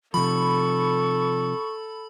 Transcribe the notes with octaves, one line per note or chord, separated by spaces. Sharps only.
C3 F3 A4 B5 C#6